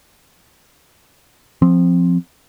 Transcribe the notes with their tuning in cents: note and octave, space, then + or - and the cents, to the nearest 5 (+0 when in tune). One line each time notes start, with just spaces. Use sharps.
F3 +0 C4 +0